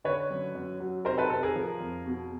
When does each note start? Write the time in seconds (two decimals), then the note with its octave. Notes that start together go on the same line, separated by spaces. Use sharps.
0.04 D3 B4 C#5
0.31 F#2
0.55 F#2
0.80 F#3
1.05 C3 A#4 C5
1.18 A4 B4
1.30 C3 A4
1.43 G#4 A#4
1.56 F3
1.80 F2
2.06 B2